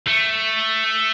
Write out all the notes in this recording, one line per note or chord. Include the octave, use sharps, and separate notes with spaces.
A3